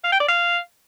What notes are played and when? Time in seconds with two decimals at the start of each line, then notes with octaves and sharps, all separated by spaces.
0.04 F5
0.12 G5
0.20 D5
0.28 F5